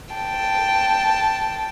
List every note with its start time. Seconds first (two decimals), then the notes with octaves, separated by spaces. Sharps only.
0.15 G5 A5